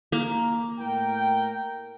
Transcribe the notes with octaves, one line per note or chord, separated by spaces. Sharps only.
A#3
A2 A#4 G5